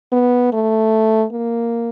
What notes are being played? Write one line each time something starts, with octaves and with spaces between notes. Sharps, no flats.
B3
A3
A#3